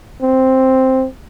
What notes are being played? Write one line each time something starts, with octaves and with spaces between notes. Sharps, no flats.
C4